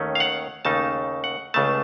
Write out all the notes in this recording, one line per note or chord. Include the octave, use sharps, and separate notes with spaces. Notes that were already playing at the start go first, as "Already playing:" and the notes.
Already playing: D#2 D#3 A3 C#4
F5
F#5
D#2 C#3 A3 D#4 A5
F#5
C#2 C#3 A3 A5